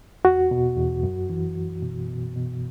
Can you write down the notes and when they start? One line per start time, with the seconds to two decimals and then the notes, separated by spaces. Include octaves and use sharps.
0.25 E2 F#4
0.51 B2
0.77 E2
1.03 F#2
1.30 E3
1.56 F#2
1.82 B2
2.08 B2
2.35 B2